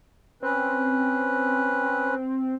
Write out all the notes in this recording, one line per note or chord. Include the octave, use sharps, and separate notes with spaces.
C4 C#4 B4